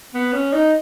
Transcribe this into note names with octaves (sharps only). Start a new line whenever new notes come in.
B3
C#4
D#4